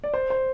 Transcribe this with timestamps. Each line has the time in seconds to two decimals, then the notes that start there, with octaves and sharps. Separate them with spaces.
0.04 D5
0.14 C5
0.30 C5